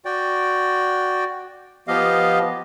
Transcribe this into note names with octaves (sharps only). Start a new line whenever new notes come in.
F#4 D5 G5
F3 B3 G4 D#5 F5